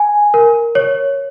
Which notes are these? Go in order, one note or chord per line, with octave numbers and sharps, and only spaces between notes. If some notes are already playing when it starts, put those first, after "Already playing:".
Already playing: G#5
A#4
C#5